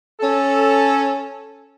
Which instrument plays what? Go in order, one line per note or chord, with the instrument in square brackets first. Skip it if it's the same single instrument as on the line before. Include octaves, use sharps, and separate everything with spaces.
[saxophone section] C#4 A4